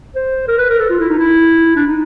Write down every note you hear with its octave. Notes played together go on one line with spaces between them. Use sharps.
C5
A#4
B4
A#4
A4
F4
E4
D#4
E4
D4
D#4